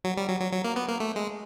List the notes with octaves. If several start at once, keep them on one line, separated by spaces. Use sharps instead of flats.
F#3
G3
F#3
F#3
F#3
A#3
B3
A#3
A3
G#3